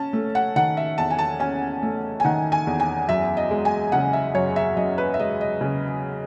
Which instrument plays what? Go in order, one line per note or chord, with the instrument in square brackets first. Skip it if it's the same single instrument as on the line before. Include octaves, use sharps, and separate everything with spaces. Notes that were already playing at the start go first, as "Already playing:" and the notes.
Already playing: [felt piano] C#4 A5
A3
F#5
D#3 F#5
E5
E2 A5
G#5
A5
C#4 G#5
A3
G#5
D#3 F#5
G#5
E2
G#5
F#2 E5
D#5
G#3
G#5
C#3 F#5
E5
F#2 C#5
E5
F#2 D#5
B4
E5
G#3 D#5
D#5
C#3